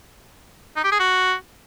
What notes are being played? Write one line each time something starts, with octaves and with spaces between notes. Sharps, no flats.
D#4
G4
G#4
F#4